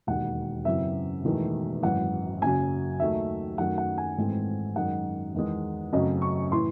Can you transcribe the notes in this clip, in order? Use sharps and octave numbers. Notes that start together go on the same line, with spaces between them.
E1 D#2 D#3 F#5
F#2 C#3 E3 C4 E5
E1 E2 D#3 A3
G#1 F#2 E3 F#5
F#1 F#2 C#3 F#3 G#5
D#2 D#3 F#3 A3 E5
F#2 D#3 F#3 A3 F#5
F#5
G#5
G#1 G#2 E3 A3 C4
F#2 D#3 G#3 F#5
E2 D#3 G#3
F#2 C#3 F#3 A3 C4 D#5
C#6
A2 E3 C6